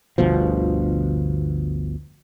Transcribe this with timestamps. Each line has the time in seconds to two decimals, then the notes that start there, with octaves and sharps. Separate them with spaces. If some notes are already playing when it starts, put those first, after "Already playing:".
0.18 G1 D2 B2 F3